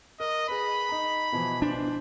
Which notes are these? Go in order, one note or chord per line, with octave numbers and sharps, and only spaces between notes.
A#4 D#5
G#4 B4 B5
D#4 A#5
B2 E3 F3
D4 C5